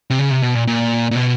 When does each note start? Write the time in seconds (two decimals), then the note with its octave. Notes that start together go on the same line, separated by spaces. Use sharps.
0.10 C3
0.19 C#3
0.31 C3
0.42 B2
0.55 A#2
0.67 A#2
1.11 A#2
1.16 B2